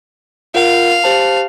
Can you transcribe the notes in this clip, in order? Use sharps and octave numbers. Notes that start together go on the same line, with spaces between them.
F4 A#4 F5 F#5
G4 C5 A5